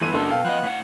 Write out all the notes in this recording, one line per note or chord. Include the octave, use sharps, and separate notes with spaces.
G1 E3 B3 A4 D#7
F#1 D4 F#4 A4
B2 F5 G5
F3 B3 D#5 F#6
A2 F#5